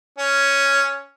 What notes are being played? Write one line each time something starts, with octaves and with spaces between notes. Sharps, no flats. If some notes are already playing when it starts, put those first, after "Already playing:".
C#4